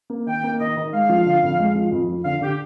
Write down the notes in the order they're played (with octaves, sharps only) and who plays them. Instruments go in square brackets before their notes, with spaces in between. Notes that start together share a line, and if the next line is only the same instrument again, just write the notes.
[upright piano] A#3
[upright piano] D#3 [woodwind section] G5
[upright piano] A#3
[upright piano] D#3 [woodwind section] D#5
[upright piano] D#3
[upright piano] G#3 [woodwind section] F5
[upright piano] F3
D3
F2
G#3
F3
F2
F3
[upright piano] D3 [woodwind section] F5
[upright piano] D3 [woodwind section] G4